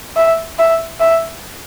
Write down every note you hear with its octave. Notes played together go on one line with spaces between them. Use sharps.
E5
E5
E5